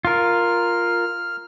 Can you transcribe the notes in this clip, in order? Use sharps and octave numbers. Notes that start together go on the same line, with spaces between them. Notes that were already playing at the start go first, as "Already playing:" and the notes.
F4 A#4 F6